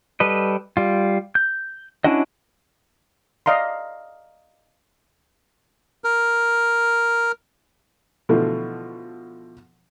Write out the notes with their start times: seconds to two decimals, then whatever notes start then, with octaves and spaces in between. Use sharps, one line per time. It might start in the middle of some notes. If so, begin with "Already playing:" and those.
0.20 G3 A4 B4 D#5
0.77 G3 F4
1.35 G6
2.04 C#4 D4 E4 F#4 D#5
3.46 D5 D#5 F5 A#5 C6
6.04 A#4
8.29 B2 D3 E3 F3 A3